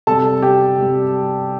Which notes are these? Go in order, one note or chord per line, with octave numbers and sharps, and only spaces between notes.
C3 G3 A4 A5
G4 G5
C3 G3